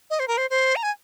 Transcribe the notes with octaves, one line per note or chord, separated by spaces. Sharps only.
D#5
C5
A#4
C5
C5
A#5
G#5